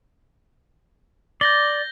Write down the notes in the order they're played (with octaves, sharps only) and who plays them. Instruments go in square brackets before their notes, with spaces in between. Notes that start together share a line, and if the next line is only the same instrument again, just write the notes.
[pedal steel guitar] D5 [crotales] G6 A#6 G7